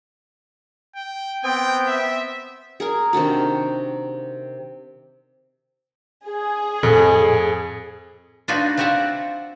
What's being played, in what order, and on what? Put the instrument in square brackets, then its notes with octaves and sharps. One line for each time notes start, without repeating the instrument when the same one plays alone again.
[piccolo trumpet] G5
[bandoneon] B3 C4 [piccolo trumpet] G5
[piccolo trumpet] E5
[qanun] G#4 A#4 G#5
C3 D#3 D4 F#4
[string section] G#4
[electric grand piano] F2 [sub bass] A2 [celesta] A4
[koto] D4 D#4 F4 F#4 B4
C4 F4 F#4 D5 E5 F#5